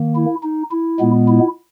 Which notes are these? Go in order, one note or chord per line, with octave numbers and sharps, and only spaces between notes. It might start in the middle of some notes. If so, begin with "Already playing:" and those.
Already playing: D#3 A#3
E4
D#4
E4
A#2 G#3 B3
E4